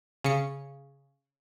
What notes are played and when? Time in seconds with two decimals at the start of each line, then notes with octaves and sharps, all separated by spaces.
0.24 C#3 C#7